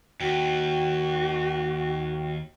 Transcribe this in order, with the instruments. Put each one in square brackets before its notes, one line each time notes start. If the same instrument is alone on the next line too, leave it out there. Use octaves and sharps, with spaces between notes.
[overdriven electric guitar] D#2 [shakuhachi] F#4 [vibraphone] G5